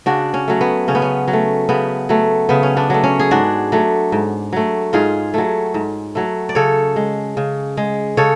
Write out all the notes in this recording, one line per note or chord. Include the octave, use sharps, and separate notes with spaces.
C#3 D4 F#4
C#4
F#3 A3
B3
C#3 C#4
B3
C#4
F#3
A3
C#3 B3
F#3 A3
C#3 B3
C#4
B3 D4
F#3 A3
C#4
G#4
G#2 D4 F#4
F#3 A3
G#2
F#3 A3
G#2 F4 G#4
F#3 A3
G#2
F#3 A3
D5
C#3 A4 C#5
G#3
C#3
G#3
C#3 A4 C#5